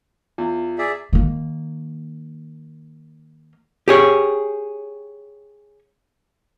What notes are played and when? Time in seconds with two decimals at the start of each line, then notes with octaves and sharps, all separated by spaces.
0.38 E2 F4
0.78 G#4 D5 E5
1.13 D#3 A#3
3.88 G4 G#4 C#5